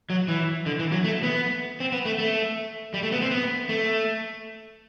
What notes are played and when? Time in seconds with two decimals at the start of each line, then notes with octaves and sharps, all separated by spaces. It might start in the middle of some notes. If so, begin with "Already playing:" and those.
0.10 F#3
0.28 E3
0.66 D3
0.79 E3
0.92 F#3
1.04 A3
1.23 B3
1.80 C4
1.92 B3
2.05 A3
2.18 A3
2.94 G3
3.03 A3
3.12 B3
3.22 C4
3.31 B3
3.69 A3